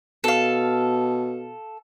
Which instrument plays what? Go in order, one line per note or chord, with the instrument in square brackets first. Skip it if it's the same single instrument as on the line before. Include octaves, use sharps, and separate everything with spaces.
[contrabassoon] B2 [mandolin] A4 F5